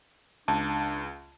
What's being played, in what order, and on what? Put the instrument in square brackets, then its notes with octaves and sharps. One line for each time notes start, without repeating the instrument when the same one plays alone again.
[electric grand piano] C#2 [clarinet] D4 [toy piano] A5